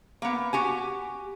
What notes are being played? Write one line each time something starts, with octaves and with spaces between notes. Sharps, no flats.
A#3 B3
F#4 G4 G#5